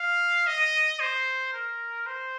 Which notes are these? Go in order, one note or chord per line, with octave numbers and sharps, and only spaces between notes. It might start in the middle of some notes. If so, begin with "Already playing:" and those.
Already playing: F5
D#5
C5
A#4
C5